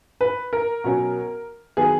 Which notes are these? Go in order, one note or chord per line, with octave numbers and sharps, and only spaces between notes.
B4
A#4
B2 F#3 C#4
D#3 F#3 B3 G#4